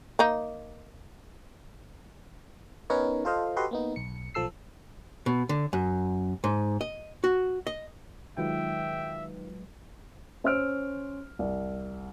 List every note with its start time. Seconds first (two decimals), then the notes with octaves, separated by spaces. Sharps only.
0.19 A#3 D#4
2.90 B3 C#4 D#4 A#4 B4 C#5
3.25 F4 A4 C5 D#5 F5
3.56 F#4 G4 A4 B4 D#5 C6
3.71 A#3 B3 D#4
3.96 B1 C#7
4.34 B1 F3 A4 E6 C7
5.26 B2
5.49 D3
5.73 F#2
6.44 G#2
6.81 D#5
7.24 F#4
7.67 D#5
8.38 D#3 F#3 G#3 F4 B4 E5 G5
10.44 C#4 C5 E6 F6 D7
11.39 C2